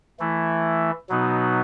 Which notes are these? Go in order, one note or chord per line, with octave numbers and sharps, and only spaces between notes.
E3 A3 E4
B2 F#3 B3 D#4 F#4